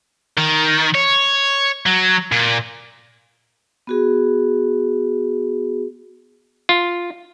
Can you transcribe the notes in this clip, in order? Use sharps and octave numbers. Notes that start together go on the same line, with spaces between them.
D#3
C#5
F#3
A#2
B3 F#4 G#4
F4